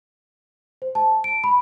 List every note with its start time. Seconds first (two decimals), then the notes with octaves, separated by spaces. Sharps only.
0.82 C5
0.95 A5
1.24 D7
1.44 B5